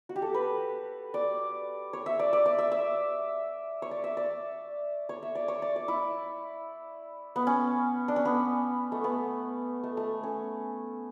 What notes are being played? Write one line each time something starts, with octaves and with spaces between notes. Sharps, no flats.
F#4
G4
A4
B4
D5
C#5
E5
D5
D5
D5
E5
E5
C#5
D5
E5
D5
C#5
E5
D5
C#5
D5
D5
E4
B3
C#4
D4
C#4
B3
A3
B3
A3
A3
C#4